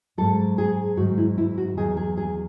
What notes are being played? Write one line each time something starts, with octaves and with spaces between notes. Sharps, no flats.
G#2 F#3 A4
G#4
G#2 D#3 F#3 F#4
E4
E4
F#4
E2 D#3 F#3 G#4
G#4
G#4